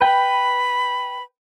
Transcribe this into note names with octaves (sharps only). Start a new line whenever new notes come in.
B4 G5 B5